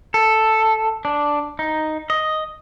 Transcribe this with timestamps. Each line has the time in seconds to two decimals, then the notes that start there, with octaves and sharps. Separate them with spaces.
0.14 A4
1.05 D4
1.59 D#4
2.10 D#5